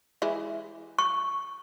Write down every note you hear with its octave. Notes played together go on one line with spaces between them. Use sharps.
E3 G#3 E4
C#6